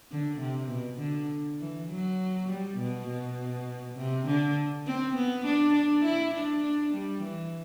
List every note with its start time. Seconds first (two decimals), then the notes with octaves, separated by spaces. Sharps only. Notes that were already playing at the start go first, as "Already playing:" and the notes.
0.11 D3
0.41 C3
0.70 B2
1.00 D3
1.60 E3
1.89 F#3
2.49 G3
2.78 B2
3.07 B2
3.97 C3
4.27 D3
4.87 C4
5.16 B3
5.46 D4
5.75 D4
6.06 E4
6.35 D4
6.64 D4
6.94 G3
7.23 E3